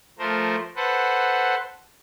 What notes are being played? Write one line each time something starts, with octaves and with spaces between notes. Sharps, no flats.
F3 A3 A#4 C5
A4 B4 C5 F#5